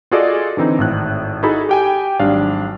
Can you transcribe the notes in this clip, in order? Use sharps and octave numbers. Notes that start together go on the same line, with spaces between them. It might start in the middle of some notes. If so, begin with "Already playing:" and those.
F4 F#4 G#4 A4 D5 D#5
D3 E3 C4 D#4
G#1 A2 F#6
D#4 E4 F#4 G#4 A4 B5
G4 G5 G#5
G#1 F#3 G3 D4 F5